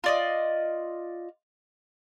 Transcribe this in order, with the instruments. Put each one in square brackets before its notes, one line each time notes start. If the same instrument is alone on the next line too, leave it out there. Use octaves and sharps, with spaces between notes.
[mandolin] F4 D5 D#5